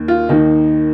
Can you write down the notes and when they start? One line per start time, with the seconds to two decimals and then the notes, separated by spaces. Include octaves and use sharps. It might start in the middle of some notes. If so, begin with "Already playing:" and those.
Already playing: D#2 D#3
0.08 F4
0.29 D#2 D#3 D#4